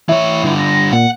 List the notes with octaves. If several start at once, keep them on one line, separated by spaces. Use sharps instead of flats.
E3 E4 C#5
G2 D3
A#6
A#2 F#5